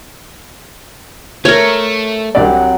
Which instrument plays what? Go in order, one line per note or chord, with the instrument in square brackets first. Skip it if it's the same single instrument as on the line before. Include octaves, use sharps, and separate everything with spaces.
[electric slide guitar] A3 [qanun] A#4 C#5
[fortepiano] C2 C3 D5 [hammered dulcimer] F#3